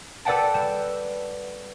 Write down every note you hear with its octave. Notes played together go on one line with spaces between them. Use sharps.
A4 B4 D5 F#5 G5 A5
G3 E7